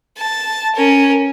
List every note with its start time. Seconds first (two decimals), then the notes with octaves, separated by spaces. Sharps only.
0.18 A5
0.76 C#4 A#4